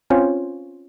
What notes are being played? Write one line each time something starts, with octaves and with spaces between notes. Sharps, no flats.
C4 C#4 F4 C5 C#5